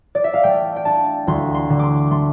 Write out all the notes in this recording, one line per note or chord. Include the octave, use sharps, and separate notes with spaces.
D5
E5
F5
A3 G5
G5
D4 A5
D2 C6
C6
D3
C6 D6
A3 C6